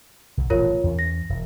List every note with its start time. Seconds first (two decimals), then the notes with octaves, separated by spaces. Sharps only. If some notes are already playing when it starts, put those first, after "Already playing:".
0.37 C2
0.50 D#1 A1 B2 F4 A#4 C#5
0.84 E2 C#4
0.99 A#6
1.29 E1